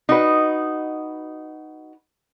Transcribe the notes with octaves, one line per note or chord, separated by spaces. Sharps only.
D#4 F#4 B4